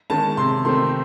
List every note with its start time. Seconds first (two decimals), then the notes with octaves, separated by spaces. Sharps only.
0.10 D#3 G#3 C#4 A5
0.37 C3 C6
0.65 D#3 A3 C4 C6